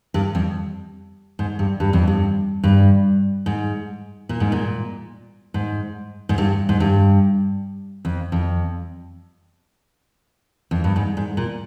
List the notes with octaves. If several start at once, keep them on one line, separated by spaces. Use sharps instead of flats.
G2
F2
G#2
G2
G2
F2
G2
G2
G#2
A#2
G#2
A#2
G#2
G#2
G2
G#2
G2
F2
F2
F2
G2
G#2
G#2
A#2